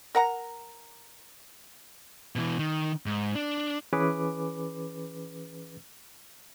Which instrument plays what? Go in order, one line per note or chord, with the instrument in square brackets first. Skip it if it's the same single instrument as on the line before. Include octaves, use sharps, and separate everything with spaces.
[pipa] A#4 F#5 A#5
[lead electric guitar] B2 E3
D#3
G#2
D4
[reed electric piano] E3 C#4 G#4 B4 D6